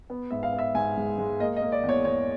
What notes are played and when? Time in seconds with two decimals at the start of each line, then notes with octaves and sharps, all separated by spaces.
0.10 B3
0.31 G#2 E5
0.43 F5
0.53 B3
0.58 E5
0.75 G#2 G#5
0.97 G#3
1.18 G#3
1.40 A#3 D#5
1.56 D#5
1.62 A#3
1.72 D5
1.83 E2
1.89 C#5
2.05 E2 C#5